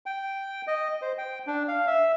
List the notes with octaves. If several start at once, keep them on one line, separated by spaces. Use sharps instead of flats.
G5
D#5
C5
G5
D4
F5
E5